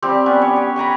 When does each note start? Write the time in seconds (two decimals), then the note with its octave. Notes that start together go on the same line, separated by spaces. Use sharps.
0.02 F3 G3 C4 G4
0.26 B3 C#4 B4 D5
0.42 C#5
0.56 G4
0.76 G5 G#5 A#5 B5